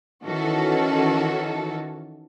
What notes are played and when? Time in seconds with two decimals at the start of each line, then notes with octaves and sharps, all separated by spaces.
0.24 D#3 E3 C#4 F#4 A4